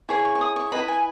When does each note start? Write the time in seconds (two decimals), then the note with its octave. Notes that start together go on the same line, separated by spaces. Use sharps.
0.09 E4 G#4 C#5 C#6
0.25 C#6
0.35 C#6
0.41 D#6
0.56 C#6
0.72 E4 G#4 B4 D#5 B5
0.88 G#5